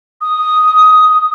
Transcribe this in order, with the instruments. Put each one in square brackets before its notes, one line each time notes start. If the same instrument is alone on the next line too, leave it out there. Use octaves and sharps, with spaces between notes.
[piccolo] D#6